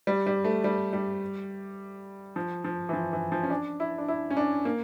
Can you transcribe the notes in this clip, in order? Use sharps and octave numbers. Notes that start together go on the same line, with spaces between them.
G3
G3
A3
G3
G3
F3
F3
E3
F3
E3
F3
C#4
D4
E4
D4
E4
C#4
D4
A#3